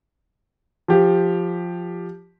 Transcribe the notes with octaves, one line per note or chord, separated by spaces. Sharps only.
F3 G4